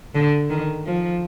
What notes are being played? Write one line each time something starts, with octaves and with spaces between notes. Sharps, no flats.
D3
D#3
F3